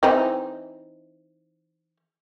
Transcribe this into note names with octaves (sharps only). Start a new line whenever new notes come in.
E3 C4 D#4